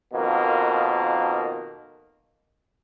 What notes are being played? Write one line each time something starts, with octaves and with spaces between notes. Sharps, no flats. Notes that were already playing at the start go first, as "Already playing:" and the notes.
F2 B2 D#3 A#3